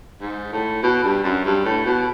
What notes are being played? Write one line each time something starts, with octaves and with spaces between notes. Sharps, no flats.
G#2
A2
B2
G2
F#2
G2
A2
B2